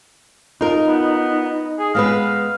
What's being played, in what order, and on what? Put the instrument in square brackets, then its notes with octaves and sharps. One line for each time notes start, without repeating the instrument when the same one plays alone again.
[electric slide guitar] D#4 [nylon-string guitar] F4 A#4
[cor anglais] B3
G#4
[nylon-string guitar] G#3 B3 B4 [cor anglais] F5